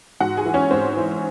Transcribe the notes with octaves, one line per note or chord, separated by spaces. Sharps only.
G#2 F#4 F#5
G#4 G#5
E3
C#4 C#5
G#2 C4 C5
E3